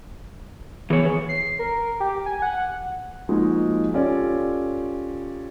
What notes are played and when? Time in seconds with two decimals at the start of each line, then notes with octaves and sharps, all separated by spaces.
0.90 E3 B3 G#4 C#5
1.29 C7
1.59 A#4
2.00 G4
2.26 G#5
2.42 F#5
3.29 F3 G#3 A#3 D#4 F#4
3.94 C#4 F4 G4 A4 C#5 D5